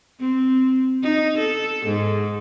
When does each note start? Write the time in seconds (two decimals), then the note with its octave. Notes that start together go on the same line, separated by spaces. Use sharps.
0.20 C4
1.02 D#4
1.37 A4
1.86 G#2